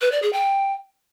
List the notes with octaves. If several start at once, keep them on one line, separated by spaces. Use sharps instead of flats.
B4
D5
G#4
G5